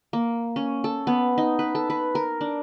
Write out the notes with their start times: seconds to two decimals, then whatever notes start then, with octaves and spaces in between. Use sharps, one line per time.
0.13 A#3
0.56 C#4
0.84 A4
1.07 B3
1.38 D#4
1.59 B4
1.75 A4
1.90 B4
2.15 A#4
2.41 D4